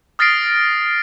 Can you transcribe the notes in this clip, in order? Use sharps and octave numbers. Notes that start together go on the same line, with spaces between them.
D#6 F6 A6 A#6 C7 D7